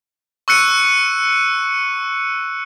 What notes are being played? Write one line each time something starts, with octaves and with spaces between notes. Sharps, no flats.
C#6 E6 F#6 C#7 D#7